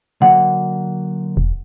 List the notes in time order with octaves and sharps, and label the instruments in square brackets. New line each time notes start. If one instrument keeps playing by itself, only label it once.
[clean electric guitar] D3 F#3 A#3 [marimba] F#5
[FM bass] E1